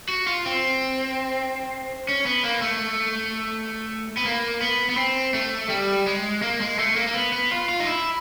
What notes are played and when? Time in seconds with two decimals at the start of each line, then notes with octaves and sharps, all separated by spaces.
0.09 F#4
0.27 F4
0.46 C4
2.09 C#4
2.26 B3
2.44 A#3
2.62 A3
4.17 B3
4.25 A#3
4.61 B3
4.89 B3
4.97 C4
5.34 A3
5.69 G3
6.07 G#3
6.42 A#3
6.61 G#3
6.79 A3
6.96 A#3
7.07 A#3
7.15 B3
7.33 B3
7.51 F4
7.69 F4
7.80 D#4
7.87 E4